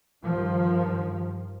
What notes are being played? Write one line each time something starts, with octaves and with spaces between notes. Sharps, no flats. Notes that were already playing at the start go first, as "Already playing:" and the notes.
G2 D#3 F3